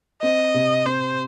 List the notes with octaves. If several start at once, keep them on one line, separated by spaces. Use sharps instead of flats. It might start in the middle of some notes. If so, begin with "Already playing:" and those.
C4 D#5
C3
C4 C5